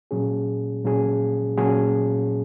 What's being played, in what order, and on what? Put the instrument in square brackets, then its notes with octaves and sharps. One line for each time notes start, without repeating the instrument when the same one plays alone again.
[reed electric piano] A#2 F#3 C#4 G#4
A#2 F#3 C#4 G#4
A#2 F#3 C#4 G#4